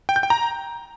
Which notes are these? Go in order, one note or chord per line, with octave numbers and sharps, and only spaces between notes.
G5
G6
G5
A#5